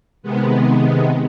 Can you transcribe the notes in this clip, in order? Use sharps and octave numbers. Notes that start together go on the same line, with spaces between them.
C3 D#3 G#3 B3